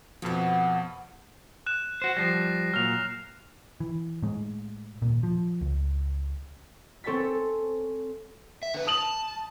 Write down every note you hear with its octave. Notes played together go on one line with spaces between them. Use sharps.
F2 B2 F3 B3 F#4
F#6 E7
F#4 C5
F3 G3 A#6 C7
A#2 F#3 F6 F7
E3
A2 G#3
D#1 C2 A#2
F3
C#2
C4 A4 C#5 G#5 A6 B6
E5
D3 B4
A5 D#6 F7 F#7